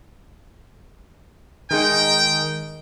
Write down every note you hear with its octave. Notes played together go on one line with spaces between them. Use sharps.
D#3 G#3 D#4 G5